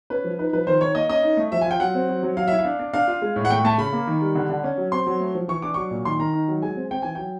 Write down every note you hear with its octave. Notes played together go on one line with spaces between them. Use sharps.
C#4 B4
F3
D#4 B4
F3 B4
D#3 C5
D#3 C#5
A#3 D#5
C#4 D#5
D#4
A3
F3 E5
G#5
F4 G5
F#3 F#5
C4
F#3
F#3
F#3 F5
E4 E5
F5
D4
D4
D4 F5
F4
G#3
A2
F#5
A3 G5
A3 A5
C#3 B5
A#3
D#3
G3
D3
D3
C#4
F#3
C4 C6
F#3
A3
F3
E3 C#6
D4 D6
F#3 C#6
A#2
D#3 C6
D#3 A#5
D#4
F#3
G#3 G#5
C4
C4 G5
E3 G#5
F#3 G5